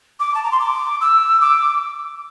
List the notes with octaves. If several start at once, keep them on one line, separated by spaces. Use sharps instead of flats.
D6
A5
A#5
C6
D6
E6
D6